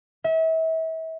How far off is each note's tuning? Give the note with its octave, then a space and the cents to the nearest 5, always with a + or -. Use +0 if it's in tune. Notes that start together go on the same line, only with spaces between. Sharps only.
E5 -35